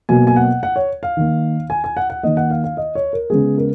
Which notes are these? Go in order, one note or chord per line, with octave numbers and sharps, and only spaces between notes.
B2 F#3 A#3 G#5
G#5
F#5
F#5
C#5
F5
D#3 A#3
G#5
G#5
F#5
F#5
D#3 A#3 D#5
F#5
F5
F5
D#5
C#5
A#4
C#3 G#3 B3 G#4
A#4